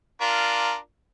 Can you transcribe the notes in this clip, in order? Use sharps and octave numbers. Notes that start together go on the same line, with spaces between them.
D4 F4 A#4